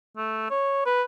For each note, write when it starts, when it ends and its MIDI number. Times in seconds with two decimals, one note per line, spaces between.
0.17 0.49 57
0.50 0.83 73
0.86 1.03 71